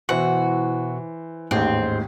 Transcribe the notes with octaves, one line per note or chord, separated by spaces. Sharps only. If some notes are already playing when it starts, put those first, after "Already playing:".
B2 E3 E4 F#4 C5 C#6
A1 D#2 G#2 G#3 C4 G6